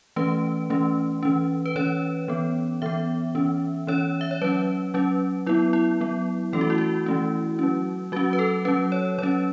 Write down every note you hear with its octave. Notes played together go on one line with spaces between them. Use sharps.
E3 A3 C#4 B4
E3 A3 C#4
E3 C#4
B4
E3 C#4 C#5
E3 B3
E3 B3 E5
E3 C#4
E3 C#4 C#5
E5
C#5
F#3 C#4 B4
F#3 C#4
F#3 B3 E4
E4
F#3 B3
E3 A3 C#4 A4
F#4
E4
F#4
E3 A3 C#4
F#3 C#4
F#3 C#4 F#4
B4
A4
F#3 C#4 B4
C#5
F#3 C#4 C#5